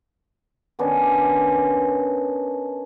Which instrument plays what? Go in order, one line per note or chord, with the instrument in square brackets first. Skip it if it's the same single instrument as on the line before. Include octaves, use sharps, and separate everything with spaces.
[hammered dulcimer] D#3 B3 C#4 D4